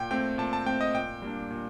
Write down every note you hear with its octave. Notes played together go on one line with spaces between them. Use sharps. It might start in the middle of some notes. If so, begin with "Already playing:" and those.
Already playing: A#2 G5
A3 C4 G5
A#2 A5
A5
A3 C4 G5
D#5
A#2 G5
G3 A#3 D4
A#2